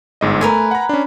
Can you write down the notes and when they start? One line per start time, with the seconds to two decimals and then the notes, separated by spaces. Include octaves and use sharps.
0.21 G1 G#2 D#5
0.41 A3 A#4 B4 G#5
0.71 F#5 A#5
0.89 C#4 D4